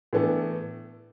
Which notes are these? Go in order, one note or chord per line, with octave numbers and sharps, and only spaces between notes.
A2 E3 B3 D4 A4